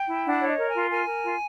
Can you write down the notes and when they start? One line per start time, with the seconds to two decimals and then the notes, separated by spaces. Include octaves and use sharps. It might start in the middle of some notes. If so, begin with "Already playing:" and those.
Already playing: G5
0.08 E4
0.25 D4 F#5
0.41 C#5
0.47 D#5
0.58 A#4
0.68 G#5
0.74 F4
0.90 A#4 G#5
1.07 A#4
1.24 F4